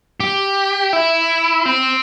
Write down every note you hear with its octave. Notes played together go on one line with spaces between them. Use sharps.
G4
E4
C4